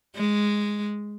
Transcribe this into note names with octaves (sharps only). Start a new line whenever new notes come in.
G#3